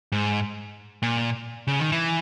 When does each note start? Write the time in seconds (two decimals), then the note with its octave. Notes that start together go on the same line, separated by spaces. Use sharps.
0.12 G#2
1.02 A#2
1.67 C#3
1.80 D#3
1.92 E3